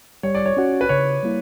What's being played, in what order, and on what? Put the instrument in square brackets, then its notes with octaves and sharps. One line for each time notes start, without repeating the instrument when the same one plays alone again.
[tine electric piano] G3 [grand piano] C#5
[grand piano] D5
C#5
[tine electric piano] C#4 F#4
[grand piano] B4
[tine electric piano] C#3 [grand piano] C#5
[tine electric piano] G3 A#3 E4